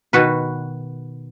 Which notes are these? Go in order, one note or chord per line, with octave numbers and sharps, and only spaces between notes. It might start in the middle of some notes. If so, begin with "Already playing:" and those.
B2 D#3 F#4 B4